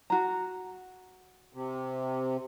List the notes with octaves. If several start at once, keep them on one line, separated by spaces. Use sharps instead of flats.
F#4 A#5
C3